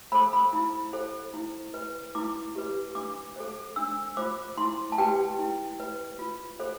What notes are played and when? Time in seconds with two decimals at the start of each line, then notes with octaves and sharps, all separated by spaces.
0.12 A4 C5 B5
0.33 B5
0.53 E4
0.93 A4 C5
1.34 E4
1.74 B4
2.15 E4 D6
2.55 G4 B4
2.95 D4 D6
3.36 A4 C5
3.76 D4 E6
4.17 F4 C5 D6
4.58 E4 C6
4.92 A5
4.98 G4 B4 G5
5.39 E4
5.80 B4
6.19 F4
6.60 A4 C5